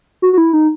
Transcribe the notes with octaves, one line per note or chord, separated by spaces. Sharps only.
F#4
F#4
E4
D#4